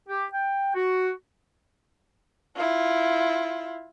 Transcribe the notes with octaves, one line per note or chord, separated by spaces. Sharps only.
G4
G5
F#4
E4 F4